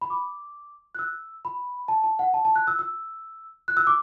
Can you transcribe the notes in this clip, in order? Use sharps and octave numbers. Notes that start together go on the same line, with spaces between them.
B5
D6
F#6
E6
B5
A5
A5
F#5
A5
A5
F#6
E6
E6
F#6
E6
D6